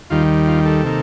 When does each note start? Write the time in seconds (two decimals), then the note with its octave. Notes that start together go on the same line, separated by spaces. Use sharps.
0.10 D#2 D#3 G3 F4
0.47 F4
0.66 A4
0.84 C3 D#3 A#3